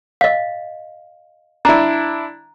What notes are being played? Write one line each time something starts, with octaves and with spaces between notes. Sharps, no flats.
D#5 F5
D4 E4 A#5